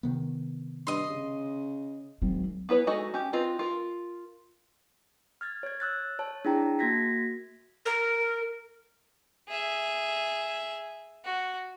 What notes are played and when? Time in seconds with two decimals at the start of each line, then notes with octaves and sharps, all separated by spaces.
0.03 C3 D#3 B3
0.87 G2 D#5 C6
1.09 C#3
2.22 G#1 F#3
2.69 B3 E4 B4 C#5
2.87 G#3 D#4 F#4 A4 D#5
3.14 C#4 G4
3.33 C4 F4 B4 D#5
3.59 F4 A#4
5.41 F6 G#6 A6
5.63 C#5 G#6
5.80 E6 F#6 A6
6.19 C#5 A5
6.45 D4 E4 G#4 G5 A5 A#5
6.79 A#3 F#4 G#6 A#6 B6
7.85 A#4
9.49 G#4 E5
11.25 F#4